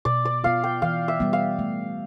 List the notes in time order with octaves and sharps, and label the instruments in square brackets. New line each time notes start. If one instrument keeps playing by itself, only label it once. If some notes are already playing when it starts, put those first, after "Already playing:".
[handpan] B2 [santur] D5
[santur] D5
[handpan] B3 F4 [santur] F5
[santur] G5
[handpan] E3 [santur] F5
[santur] E5
[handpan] G3 B3
[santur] F5
[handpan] A3